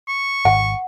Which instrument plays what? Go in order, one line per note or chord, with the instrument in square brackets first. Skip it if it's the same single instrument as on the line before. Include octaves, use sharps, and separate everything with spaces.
[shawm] C#6
[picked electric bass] G#1 [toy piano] F#5